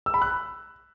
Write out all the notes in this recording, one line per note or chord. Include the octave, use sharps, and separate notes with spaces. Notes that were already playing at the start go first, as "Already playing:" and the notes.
E6
B5
F#6